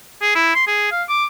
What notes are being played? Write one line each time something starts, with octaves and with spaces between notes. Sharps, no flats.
G#4
E4
C6
G#4
F5
D6